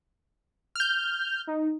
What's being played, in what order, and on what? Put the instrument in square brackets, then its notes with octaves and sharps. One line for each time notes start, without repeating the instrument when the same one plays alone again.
[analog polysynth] F6 G6
[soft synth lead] D#4